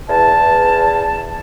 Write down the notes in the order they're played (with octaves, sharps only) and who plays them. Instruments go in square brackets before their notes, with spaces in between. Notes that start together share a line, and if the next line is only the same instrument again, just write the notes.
[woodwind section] E2 A5